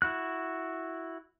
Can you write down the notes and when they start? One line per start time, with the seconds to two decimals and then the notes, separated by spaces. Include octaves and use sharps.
0.02 E4 F#4 F#6